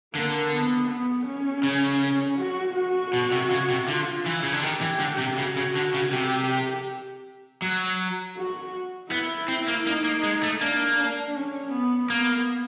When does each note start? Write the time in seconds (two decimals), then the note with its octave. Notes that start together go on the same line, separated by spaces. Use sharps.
0.14 D3 A#3
0.51 B3
0.89 B3
1.27 C#4
1.63 C#3
2.39 F#4
2.76 F#4
3.13 B2
3.32 C3
3.51 C#3
3.70 C3
3.88 D3 F4
4.26 E3
4.43 C#3
4.53 D3
4.63 D#3 G4
4.81 E3
5.00 D3
5.18 C3
5.38 C#3 F#4
5.56 C#3
5.76 D3
5.94 C#3
6.12 C3 G4
7.62 F#3
8.37 F#4
9.12 B3 E4
9.48 C4
9.68 A#3
9.86 A#3 D#4
10.04 A#3
10.23 G#3
10.43 A3
10.61 A#3 D4
10.99 D4
11.35 C#4
11.73 B3
12.10 A#3 B3